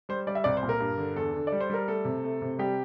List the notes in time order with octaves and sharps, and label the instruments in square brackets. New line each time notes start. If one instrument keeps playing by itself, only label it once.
[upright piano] G3 C5
G3 D5
E5
C2 D5
C5
A#2
A#4
G2
D3
E2 A4
D3
D5
G3
C5
G3 A#4
A3 A4
C3
A3
C3
G3 G4